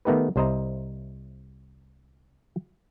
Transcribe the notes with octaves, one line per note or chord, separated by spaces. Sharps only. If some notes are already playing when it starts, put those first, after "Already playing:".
D#3 A3 B3 D#4 G4 B4
C2 C3 C5 D#5 A#5